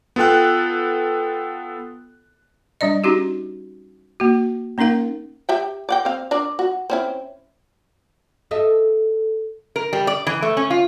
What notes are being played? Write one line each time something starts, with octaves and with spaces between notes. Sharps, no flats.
B3 F4 A4 G5 F#6
G3 D4 D5 D#5
C#4 D#4 F#4 G4
A#3 F#4
A#3 C#4 D#4 A#4 F5
G4 E5 G5
D5 F#5 G5
C4 F5
D4 A#4 D5
F#4
C4 C#4 E4
A4 D#5 E5
A#4
G3
D5
E3
A3
C#4
F4